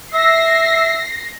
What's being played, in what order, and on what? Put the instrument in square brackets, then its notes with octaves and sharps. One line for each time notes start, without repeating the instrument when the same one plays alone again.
[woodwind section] E5 [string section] A#6 C7